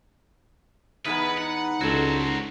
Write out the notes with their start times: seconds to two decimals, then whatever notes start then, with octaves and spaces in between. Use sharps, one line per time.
1.05 E2 G#3 B3 D#4 B4
1.38 D#4 F#5
1.81 C#2 F#3 D4 F#4 A4 C5